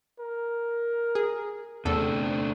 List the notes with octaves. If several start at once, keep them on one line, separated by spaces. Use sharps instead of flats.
A#4
G#4
E2 C3 A3 C4 D4 A4